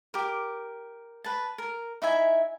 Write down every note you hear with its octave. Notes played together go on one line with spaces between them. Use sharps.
G4 A#4
B4 A5
A#4
D#4 E4 E5 G#5